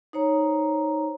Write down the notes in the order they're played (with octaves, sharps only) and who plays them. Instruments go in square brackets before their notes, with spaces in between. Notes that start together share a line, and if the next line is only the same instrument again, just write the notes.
[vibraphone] D#4 C5 C#5 A#5